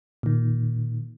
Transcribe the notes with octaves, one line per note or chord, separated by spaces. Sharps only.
A#2 D#3